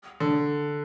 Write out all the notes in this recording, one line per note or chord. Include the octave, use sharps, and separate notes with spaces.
D3